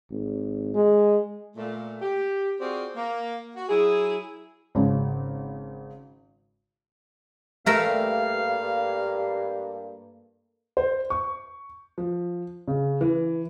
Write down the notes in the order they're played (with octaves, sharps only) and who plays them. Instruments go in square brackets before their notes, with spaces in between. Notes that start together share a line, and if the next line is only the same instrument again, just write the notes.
[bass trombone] G#1
G#3
[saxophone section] A#2 A3
G4
C4 F4 F#4 G#4 C5 D5
A#3
F#4
F#3 E4 G#4
[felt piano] G#1 C#3
[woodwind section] G2 [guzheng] A3 A#4 E5 [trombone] A#3 [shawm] F5
[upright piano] C5
C#6
F3
C#3
E3